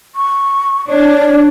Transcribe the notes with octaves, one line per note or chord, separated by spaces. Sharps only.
C#6
D4 C#5